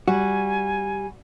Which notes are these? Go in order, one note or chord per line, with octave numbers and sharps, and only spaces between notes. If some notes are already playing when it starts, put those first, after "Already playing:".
G3 F#4 G#5